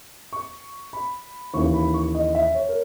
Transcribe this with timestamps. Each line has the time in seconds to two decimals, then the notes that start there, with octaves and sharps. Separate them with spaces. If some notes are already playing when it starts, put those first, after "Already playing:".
0.33 C#6
0.93 B5
1.54 D#2 C#3 E3 C#6
1.74 B5
1.94 C#6
2.15 D#5
2.35 E5
2.55 C#5
2.69 A#4